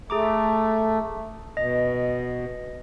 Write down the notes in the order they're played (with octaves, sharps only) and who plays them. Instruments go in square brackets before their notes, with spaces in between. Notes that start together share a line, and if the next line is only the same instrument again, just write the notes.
[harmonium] A3 [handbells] G#4 A#5 D6
[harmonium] B2 [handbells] D#5